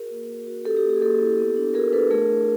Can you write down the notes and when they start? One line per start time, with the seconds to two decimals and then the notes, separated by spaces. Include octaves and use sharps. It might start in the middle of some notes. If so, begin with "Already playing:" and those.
Already playing: F#4 G#4 A#4
0.11 A#3
0.29 F#4
0.47 F#4
0.65 C#4 G4 A4
0.77 G4
0.84 A#3
0.89 G4
0.96 G#4
1.01 A#3 G4 A4
1.20 E4
1.39 B3
1.57 D4
1.74 F#4 G#4 A#4
1.93 D4 A4 B4
2.11 A3 G#4 A#4
2.30 E4